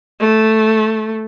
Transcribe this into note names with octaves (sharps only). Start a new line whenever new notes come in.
A3